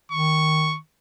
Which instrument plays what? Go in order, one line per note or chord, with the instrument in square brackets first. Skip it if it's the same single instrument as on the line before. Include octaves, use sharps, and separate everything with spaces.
[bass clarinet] D#3 [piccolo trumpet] C#6